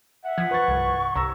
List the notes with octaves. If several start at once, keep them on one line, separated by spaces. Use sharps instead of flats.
E5 F#5
F3 G#6 B6
B4 C#6 A6
C2 G2
C2 A#5 E6 A#6